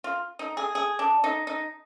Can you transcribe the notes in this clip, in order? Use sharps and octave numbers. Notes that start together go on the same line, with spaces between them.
F4
D#4
G#4
G#4
D4
D#4
D#4